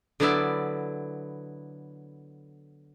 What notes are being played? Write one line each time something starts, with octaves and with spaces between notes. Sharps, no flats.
D3 F#3 B3 E4 D5 E5